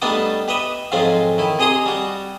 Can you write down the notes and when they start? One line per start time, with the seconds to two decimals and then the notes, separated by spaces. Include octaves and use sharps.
0.02 G3 A3 B3 D4 D#4 A4
0.48 G4 B4 D#5 E5
0.92 F2 G#2 F#3 G#3 C4 F4
1.38 D#3 E4
1.59 C3 G#4 D#5 A#5 C6 D#6
1.86 G3 F#4